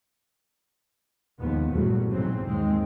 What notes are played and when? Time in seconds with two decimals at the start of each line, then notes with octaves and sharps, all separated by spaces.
1.39 D#2 G#2 F3 B3
1.72 A#1 E2 G2 F#3 G3 A3
2.10 B1 G#2 C#3 E3 F#3 C4
2.45 D#2 G#2 G#3 C4